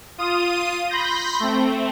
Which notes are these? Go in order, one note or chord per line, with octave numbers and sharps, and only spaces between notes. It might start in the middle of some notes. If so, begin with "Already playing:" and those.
F4 D#6 D#7
B5 C6 G6 A#6
A3 C4